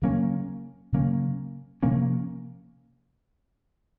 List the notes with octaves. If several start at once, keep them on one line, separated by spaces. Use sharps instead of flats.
C#3 F#3 A#3 C#4
C#3 F#3 A#3 C#4
C3 F3 A#3 C#4